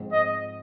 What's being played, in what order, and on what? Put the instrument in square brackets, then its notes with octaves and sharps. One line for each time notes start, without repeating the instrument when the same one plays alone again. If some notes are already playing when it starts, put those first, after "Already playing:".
Already playing: [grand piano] G#2 F3 G#3 C4
[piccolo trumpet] D#5